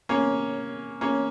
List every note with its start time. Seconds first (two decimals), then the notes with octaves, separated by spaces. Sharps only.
0.09 A#3 C#4
1.01 A#3 C#4